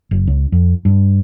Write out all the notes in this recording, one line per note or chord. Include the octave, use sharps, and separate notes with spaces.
F#1
C#2
F2
G2